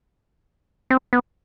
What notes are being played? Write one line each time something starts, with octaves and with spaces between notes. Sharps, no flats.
C4
B3